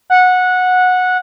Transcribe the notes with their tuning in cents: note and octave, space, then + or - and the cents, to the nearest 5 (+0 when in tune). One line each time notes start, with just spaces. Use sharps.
F#5 -15